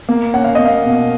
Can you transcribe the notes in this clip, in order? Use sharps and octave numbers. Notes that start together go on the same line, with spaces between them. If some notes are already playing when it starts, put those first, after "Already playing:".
A#3
C#4 F#5
F5
A#3 D#5
F5
B2